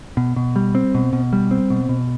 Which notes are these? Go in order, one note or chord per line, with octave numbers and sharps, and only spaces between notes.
B2
B2
G3
C4
B2
B2
G3
C4
B2
B2